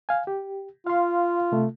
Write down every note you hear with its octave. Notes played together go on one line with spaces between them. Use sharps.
F5 G#5
G4
F4 F5 C6
C3 A3